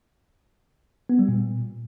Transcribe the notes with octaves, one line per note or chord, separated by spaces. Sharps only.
B3
G3
A#2